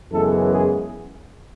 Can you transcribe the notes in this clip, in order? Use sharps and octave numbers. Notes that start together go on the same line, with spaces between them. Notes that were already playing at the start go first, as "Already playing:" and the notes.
F#2 C#3 E3 G#3 B3 A4
G#4